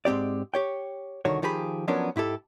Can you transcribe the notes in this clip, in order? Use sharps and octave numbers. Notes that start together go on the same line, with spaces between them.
G#2 G#3 C4 G4 D5
G4 C#5 G5
C2 D3 D#3 F#4 C#5
D#3 F3 G4 G#4 B5
F3 F#3 B3 C#4 D4 A#4
G#2 E4 G4 A4